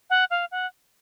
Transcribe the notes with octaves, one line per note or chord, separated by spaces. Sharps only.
F#5
F5
F#5